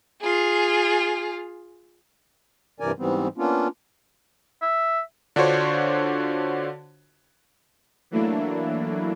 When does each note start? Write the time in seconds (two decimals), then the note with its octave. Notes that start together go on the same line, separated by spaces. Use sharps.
0.21 F4 G#4
2.80 G2 C3 E3 A#4 D5 G#5
2.99 G#2 E3 G3 B3 C4
3.38 A#3 B3 C#4 D4 F4
4.62 E5
5.36 D3 D4 F4 F#4 C5 C#5
8.11 E3 F#3 A3 A#3 D4 E4